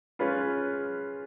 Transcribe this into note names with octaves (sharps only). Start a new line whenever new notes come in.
G#3 C#4 F4 B4